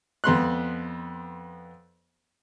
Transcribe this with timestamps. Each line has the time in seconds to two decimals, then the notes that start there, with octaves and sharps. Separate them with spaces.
0.24 F2 B3 C6 F#6